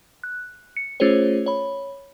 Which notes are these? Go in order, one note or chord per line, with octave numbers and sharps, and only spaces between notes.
F#6
C#7
A3 C#4 F4 G#4 C5 C#5
C#5 B5